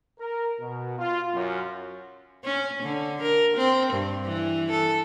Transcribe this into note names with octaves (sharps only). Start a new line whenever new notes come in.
A#4
B2
F4
F#2
C#4
D3
A#4
C4
G2
E3
A4